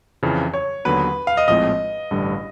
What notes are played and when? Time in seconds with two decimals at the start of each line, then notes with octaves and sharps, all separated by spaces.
0.23 F2 C#3 E3
0.54 C#5
0.85 D#2 D3 F#3 B3 B4
1.27 F5
1.37 D#5
1.48 A#1 A2 F3 G#3 C4 D#5
2.11 A1 G2 D3 G3